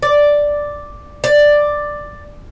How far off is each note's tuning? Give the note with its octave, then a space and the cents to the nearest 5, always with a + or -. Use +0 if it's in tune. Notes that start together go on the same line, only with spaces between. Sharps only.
D5 +0
D5 +5